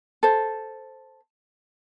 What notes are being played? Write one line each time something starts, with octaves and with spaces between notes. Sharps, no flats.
A4 C5